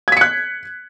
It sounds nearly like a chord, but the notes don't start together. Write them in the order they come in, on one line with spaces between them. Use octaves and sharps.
G#6 B6 C#7 F#6